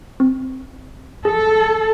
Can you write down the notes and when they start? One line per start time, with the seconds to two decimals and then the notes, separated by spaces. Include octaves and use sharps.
0.20 C4
1.25 G#4 A4